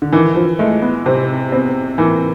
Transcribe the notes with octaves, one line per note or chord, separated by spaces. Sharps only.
D3
D#3 E3
F3
G#3 A3
B3
C3 C4
B3 C4
E3 A#3